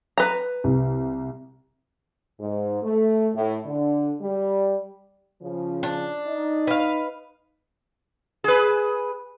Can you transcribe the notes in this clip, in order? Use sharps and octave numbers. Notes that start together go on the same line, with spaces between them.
B4 A#5
C2
G#2
A3
A2
D3
G3
C#3 F3
D4
D#4 D#5
B4 F5
G#4 B4